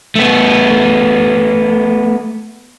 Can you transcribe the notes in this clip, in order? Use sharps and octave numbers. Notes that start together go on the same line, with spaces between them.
A3 B3